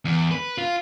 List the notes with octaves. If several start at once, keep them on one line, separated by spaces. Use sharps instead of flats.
E2
B4
F4